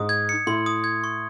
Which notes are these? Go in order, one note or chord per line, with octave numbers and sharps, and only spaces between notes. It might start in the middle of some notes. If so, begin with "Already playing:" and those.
Already playing: G#2 D#6
G#6
C#7
A2 C6
D#6
G#6
C#6